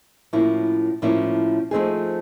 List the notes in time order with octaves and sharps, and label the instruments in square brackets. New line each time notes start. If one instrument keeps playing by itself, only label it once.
[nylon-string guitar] A2 F3 A#3 C#4 E4
A2 F3 A#3 C#4 E4
F3 A3 C4 D#4 G#4